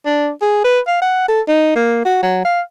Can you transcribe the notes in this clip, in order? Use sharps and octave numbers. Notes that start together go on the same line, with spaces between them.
D4
G#4
B4
F5
F#5
A4
D#4
A#3
F#4
F#3
F5